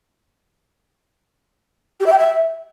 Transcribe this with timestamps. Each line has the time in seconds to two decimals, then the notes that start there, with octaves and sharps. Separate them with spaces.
2.00 G4
2.06 E5
2.12 G5
2.18 E5